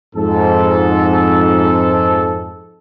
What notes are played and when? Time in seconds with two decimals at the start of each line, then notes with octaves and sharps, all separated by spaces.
0.16 F2 G#2 A4